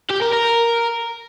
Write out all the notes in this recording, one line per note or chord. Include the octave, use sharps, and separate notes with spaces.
G4
A#4
A#4